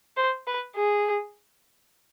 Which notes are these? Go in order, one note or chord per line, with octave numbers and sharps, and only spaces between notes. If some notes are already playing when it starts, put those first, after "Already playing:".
C5
B4
G#4